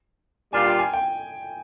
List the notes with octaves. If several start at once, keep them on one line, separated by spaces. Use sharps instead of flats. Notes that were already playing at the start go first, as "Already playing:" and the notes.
A#2 G3 D4 F4 G#5
G5
G#5
G5